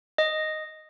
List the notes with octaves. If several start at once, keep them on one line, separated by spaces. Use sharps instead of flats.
D#5